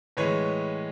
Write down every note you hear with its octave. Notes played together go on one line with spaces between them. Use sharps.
A2 E3 G#3 B4 C#5